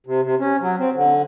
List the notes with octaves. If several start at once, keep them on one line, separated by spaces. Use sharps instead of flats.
C3
C3
C#4
F#3
C4
D3